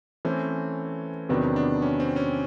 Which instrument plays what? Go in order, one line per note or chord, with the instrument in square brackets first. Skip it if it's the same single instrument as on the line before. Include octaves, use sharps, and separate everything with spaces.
[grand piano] E3 A3 C4 [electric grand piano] C#4
[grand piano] E2 C3 D#3 F#3 B3 [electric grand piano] D4
[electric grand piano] D4
C#4
C4
C#4